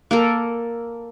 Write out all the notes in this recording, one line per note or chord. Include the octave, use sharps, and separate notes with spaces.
A#3 A4 A#4